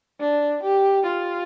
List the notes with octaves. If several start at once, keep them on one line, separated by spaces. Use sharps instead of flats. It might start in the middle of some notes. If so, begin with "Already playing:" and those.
D4
G4
F4